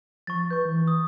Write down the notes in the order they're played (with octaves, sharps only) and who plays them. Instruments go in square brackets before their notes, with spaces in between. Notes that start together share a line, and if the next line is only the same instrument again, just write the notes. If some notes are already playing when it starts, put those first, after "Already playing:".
[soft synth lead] F3 [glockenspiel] C#6 A6
[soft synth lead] B4 [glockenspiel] C#6 G6
[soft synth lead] E3
[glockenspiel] D#6